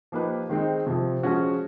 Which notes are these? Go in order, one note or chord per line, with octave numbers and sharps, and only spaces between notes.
F3 A#3 D#4 G4 B4
D#3 G#3 C4 D#4
F2 C3 F3
F3 G#3 C#4 F#4